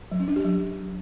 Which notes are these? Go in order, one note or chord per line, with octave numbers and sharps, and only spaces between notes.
F#3
C#4
D4
G4
F#3